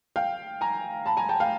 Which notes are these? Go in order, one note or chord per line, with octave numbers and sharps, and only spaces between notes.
F5 G5
G#5 A#5
A5 B5
G#5 A#5
G5 A5
F5 G5